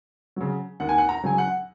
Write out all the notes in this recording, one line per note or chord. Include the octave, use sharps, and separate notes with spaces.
C#3 F#3
D#2 F#5
G#5
F#5
A#5
C#3 F#3 G#5
F#5